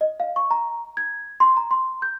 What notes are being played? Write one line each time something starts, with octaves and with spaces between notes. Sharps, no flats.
D#5
F5
C#6
A#5
G#6
C6
A#5
C6
G6